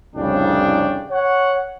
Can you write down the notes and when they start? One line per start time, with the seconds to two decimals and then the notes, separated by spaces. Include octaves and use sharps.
0.15 C2 F2 A2 C#3 D4 G5
1.10 C#5 F#5